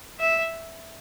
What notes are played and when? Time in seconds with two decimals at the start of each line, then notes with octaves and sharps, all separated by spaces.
0.20 E5